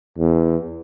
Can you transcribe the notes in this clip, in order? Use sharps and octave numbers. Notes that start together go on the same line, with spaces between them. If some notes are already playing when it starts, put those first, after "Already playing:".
E2